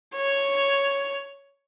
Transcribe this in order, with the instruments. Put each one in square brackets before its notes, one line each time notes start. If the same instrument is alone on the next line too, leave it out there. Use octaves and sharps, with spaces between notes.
[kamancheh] C#5